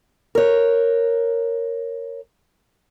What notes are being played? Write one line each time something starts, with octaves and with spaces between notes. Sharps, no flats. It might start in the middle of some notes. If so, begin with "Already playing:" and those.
A#4 C#5